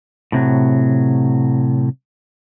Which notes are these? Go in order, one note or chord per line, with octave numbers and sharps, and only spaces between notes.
A2 C3 F#3